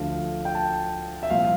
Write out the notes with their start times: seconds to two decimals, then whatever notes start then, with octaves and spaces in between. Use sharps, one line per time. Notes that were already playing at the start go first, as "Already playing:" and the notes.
Already playing: D2 D3 F3 F5
0.45 G5
0.55 A5
1.23 E5
1.30 C2 A#2 F3 F5